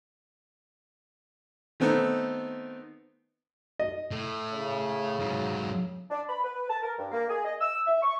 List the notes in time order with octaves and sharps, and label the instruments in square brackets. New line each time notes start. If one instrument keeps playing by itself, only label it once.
[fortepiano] D#3 A3 B3 C4 D#4
D#5
[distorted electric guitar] A2
[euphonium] C#3
[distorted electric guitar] G#2 F#3
[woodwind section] D4
B5
B4
A5
A#4
G2
A#3
G#4
D#5
E6
E5
C#6